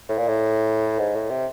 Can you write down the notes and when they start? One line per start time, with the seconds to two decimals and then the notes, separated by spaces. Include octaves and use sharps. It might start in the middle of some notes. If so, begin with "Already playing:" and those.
0.08 A2
0.18 A#2
0.28 A2
0.99 G#2
1.15 A2
1.30 C3